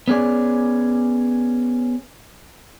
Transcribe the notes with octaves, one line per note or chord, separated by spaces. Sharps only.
B3 C#4 G#4 D5